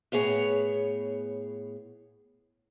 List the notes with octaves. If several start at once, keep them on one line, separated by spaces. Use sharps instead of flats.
A2 B3 G#4 C#5